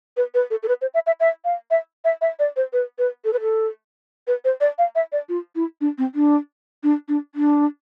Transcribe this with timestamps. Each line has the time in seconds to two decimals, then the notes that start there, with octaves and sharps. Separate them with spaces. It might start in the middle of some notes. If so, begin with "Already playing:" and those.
0.17 B4
0.34 B4
0.51 A4
0.63 A4
0.68 B4
0.82 C5
0.94 E5
1.07 E5
1.20 E5
1.45 F5
1.71 E5
2.05 E5
2.21 E5
2.39 D5
2.56 C5
2.73 B4
2.98 B4
3.25 A4
3.33 B4
3.41 A4
4.27 B4
4.45 C5
4.61 D5
4.78 F5
4.95 E5
5.12 D5
5.29 F4
5.55 E4
5.81 D4
5.98 C4
6.15 D4
6.83 D4
7.08 D4
7.35 D4